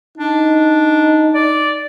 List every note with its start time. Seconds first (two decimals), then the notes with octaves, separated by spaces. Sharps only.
0.18 D4 D#4
1.35 D5